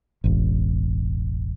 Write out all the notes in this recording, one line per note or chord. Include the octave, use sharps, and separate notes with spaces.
E1 A1